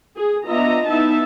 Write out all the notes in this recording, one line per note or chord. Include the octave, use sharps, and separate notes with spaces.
G#4
B3 D4 F4 D#5 E5 A#5
B3 D#4 E4 E5 A5